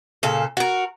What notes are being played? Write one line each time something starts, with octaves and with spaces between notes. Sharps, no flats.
A#2 C#3 A4
F#4 A#4